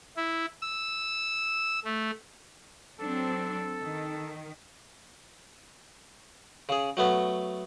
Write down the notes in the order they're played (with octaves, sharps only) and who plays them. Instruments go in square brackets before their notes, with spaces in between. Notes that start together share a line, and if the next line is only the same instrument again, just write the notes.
[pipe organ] E4
E6
A3
[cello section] F#3 C4 D4 [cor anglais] A4
[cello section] D#3
[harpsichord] C#3 G#4
F#3 A3 B3